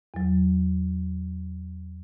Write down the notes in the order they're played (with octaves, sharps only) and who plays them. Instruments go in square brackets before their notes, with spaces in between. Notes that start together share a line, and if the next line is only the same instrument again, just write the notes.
[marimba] E2 F#3